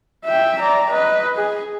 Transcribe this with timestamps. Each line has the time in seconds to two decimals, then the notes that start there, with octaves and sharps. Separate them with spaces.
0.25 E5 G5
0.59 D5 A#5
0.90 B4 D#5
1.36 G#4